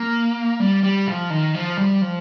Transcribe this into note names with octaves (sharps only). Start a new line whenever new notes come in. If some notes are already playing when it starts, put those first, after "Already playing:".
Already playing: A#3
G3
G3
F3
D#3
F3
G3
F3